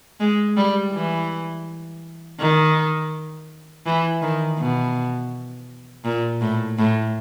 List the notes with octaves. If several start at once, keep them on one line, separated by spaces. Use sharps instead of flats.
G#3
G3
E3
D#3
E3
D#3
B2
A#2
A2
A2